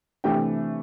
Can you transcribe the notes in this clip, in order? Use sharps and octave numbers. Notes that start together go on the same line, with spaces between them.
C3 E3 A3 D4 G4 G5